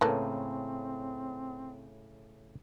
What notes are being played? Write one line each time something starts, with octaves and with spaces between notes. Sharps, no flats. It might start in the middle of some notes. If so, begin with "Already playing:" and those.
A2 C#3 E3 A3 A#3 C4